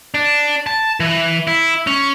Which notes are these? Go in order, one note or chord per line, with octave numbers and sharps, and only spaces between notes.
D4
A5
E3
E4
C#4